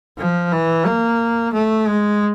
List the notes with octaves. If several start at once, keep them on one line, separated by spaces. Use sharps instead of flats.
F3
E3
A#3
A3
G#3